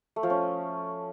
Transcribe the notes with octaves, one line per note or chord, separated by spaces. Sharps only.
A3
F3
C#4